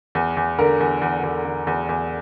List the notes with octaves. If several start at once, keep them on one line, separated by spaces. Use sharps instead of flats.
E2
E2
D3 A#4
E2
E2
E2
D3
E2
E2